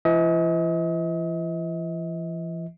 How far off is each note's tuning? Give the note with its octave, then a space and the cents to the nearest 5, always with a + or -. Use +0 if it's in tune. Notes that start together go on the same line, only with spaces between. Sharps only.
E3 +45 D#5 +40